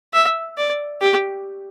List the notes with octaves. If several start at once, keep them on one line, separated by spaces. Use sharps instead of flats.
E5
D5
G4